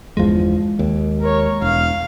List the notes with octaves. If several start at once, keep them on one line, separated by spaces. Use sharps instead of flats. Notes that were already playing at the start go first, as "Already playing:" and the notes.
G1 E2 F3 G#3
D#2
A#4 C#5
E1 F5